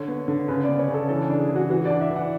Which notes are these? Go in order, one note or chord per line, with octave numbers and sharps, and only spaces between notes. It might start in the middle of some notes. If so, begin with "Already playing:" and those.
Already playing: D3 C#5
B3
D3
C#3 B4
D5
B3
C#5
C#3
A4
E3 A4
D4
G#4
E3
F#4
E3 F#4
D5
D4
E5
E3
F#5